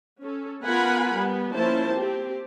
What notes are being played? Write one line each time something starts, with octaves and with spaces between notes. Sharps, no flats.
C#4 A4
B3 F4 A#4 F#5 G#5 B5
G3 B3
F3 A#3 C#4 E4 C5 A5
C4 G4